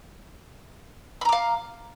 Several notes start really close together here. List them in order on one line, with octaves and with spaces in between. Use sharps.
B5 A#5 D6 F5